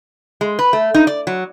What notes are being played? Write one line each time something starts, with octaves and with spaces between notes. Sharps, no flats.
G#3
B4
A3
D#4
D5
F#3